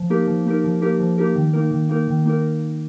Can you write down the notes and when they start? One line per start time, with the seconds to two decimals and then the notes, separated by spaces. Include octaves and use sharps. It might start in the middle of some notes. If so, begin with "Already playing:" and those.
Already playing: F3
0.10 A#3 D#4 G4 A#4
0.27 F3
0.46 A#3 D#4 G4 A#4
0.64 F3
0.81 A#3 D#4 G4 A#4
0.99 F3
1.18 A#3 D#4 G4 A#4
1.36 D#3
1.53 A#3 D#4 A#4
1.71 D#3
1.89 A#3 D#4 A#4
2.08 D#3
2.26 A#3 D#4 A#4